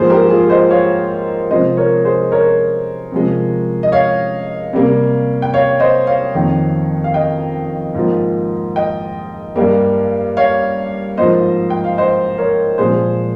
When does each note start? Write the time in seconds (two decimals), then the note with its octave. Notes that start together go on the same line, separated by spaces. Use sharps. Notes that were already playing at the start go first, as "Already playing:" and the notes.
Already playing: G#2 F3 A#3 G#4 C5
0.10 G4 A#4
0.30 F4 G#4
0.50 C5 D#5
0.70 C#5 F5
1.51 C3 F3 G#3 C5 D#5
1.77 A#4 C#5
2.05 G#4 C5
2.32 A#4 C#5
3.12 C3 F3 G#3
3.83 D#5
3.92 C#5 F5
4.73 C3 G3 A#3
5.42 G5
5.54 C#5 F5
5.80 C5 D#5
6.07 C#5 F5
6.35 F2 D#3 A#3
7.04 F5
7.14 D#5 G5
7.95 G#2 F3 A#3
8.76 D#5 G5
9.56 G2 G3 A#3
10.37 C#5 F5
11.17 G#2 F3 A#3 C5 D#5
11.70 G5
11.84 F5
11.97 C5 D#5
12.38 A#4 C#5
12.78 A#2 F3 G#3 G#4 C5